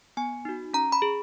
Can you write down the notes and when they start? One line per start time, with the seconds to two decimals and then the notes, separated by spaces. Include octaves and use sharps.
0.17 B3 G#5
0.45 D#4 F#4
0.73 C#4 A#5
0.92 B5
1.02 G#4